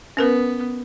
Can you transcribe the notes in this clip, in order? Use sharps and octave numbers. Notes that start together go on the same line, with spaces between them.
B3 C#4 A#4 B4